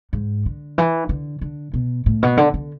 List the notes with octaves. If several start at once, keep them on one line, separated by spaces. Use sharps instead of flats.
G#2
D3
E3
D3
D3
B2
A2
B2
D3
D3